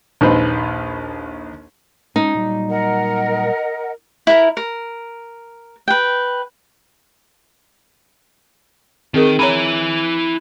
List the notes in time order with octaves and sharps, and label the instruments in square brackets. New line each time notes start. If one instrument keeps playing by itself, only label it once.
[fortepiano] A#1 D#2 D#4 B4 C5 B5
[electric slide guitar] G#3 B3 C#4 [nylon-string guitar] D#4
[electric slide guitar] A#2 F#3 G3
[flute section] A#4 D#5 F#5
[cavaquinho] E4 A#4
A#4
B4 G5
[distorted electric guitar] D#3 [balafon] C4 G#4 A#4
[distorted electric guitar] E4 G#5 [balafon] C#5 A#5 B5